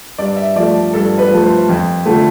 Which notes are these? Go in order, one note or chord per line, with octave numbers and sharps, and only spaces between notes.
G2 D5
E5
F3 A3 D5
G2 A4
B4
F3 A3
C5
F2
D3 F3 A3